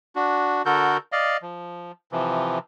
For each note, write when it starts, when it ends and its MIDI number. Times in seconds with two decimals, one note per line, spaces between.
0.16 0.62 62
0.16 0.62 66
0.66 0.97 50
0.66 0.97 66
0.66 0.97 69
0.66 0.97 70
0.66 0.97 91
1.12 1.37 74
1.12 1.37 75
1.12 1.37 77
1.42 1.92 53
2.12 2.59 48
2.12 2.59 52
2.12 2.59 53